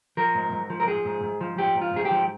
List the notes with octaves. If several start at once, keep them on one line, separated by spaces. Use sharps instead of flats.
F3 A#4
G#2
G#2
F3
A#4
F3 G#4
G#2
G#2
F3
F3 G4
G#2
F4
G#2 G#4
G4
F3